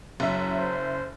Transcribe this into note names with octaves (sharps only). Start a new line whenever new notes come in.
F#1 F#3 E5
C5